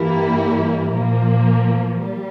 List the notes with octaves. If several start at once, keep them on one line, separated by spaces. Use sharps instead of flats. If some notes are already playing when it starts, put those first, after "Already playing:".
Already playing: G2 E3 G3 A#3 E4
A#2 F3 A#3
G3